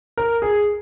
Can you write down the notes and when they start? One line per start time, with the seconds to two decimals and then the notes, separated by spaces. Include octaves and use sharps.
0.17 A#4
0.42 G#4